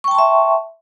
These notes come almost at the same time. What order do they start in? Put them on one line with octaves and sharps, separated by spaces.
C#6 G5 A5 C6 E5